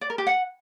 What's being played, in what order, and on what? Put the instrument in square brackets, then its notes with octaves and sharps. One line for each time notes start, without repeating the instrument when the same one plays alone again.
[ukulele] D5
A#4
G4
F#5